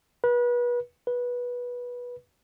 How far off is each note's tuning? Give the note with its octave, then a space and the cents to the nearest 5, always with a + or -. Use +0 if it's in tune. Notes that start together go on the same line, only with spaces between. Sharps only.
B4 -30
B4 -15